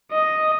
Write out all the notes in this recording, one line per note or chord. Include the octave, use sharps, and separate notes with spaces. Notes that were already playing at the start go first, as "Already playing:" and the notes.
D#5